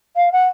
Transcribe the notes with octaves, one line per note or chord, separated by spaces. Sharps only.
F5
F#5